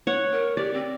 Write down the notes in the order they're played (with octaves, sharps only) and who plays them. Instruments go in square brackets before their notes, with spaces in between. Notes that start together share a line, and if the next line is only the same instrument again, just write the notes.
[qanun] C#5 F#5
[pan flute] A#4
[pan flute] G4 [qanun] D5
[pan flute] C4